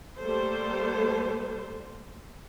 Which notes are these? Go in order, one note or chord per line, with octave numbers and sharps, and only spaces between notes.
G3 A3 A#3 A4 C5